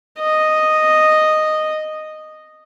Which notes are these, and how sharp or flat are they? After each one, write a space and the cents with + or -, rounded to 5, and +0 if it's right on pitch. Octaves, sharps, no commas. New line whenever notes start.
D#5 -5